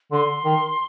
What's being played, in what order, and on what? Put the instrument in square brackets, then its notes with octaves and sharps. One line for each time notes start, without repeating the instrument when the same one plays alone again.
[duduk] D3 [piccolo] C6
[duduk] D#3